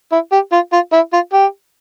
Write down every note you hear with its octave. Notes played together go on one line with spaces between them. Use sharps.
E4
G4
F4
F4
E4
F4
G4